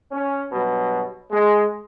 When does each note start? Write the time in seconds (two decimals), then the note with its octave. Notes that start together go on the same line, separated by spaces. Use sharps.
0.12 C#4
0.52 G2 B2 F#3
1.31 G#3